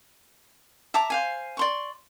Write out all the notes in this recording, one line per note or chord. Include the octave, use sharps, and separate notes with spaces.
E5 A5 A#5 D6
C5 F5 G#5
D5 C6 C#6